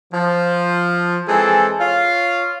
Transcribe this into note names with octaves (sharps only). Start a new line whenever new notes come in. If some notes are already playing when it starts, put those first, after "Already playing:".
F3
E3 G#3 C4 G#4 A4
F4 C#5 F5